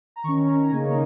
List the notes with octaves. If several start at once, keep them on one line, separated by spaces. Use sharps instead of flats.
A#5
D#3 C#4 C#6
A#5
A#5
C#3 A#3 D#4 G#5
C#5